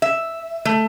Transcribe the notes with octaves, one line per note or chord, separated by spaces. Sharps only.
E5
A3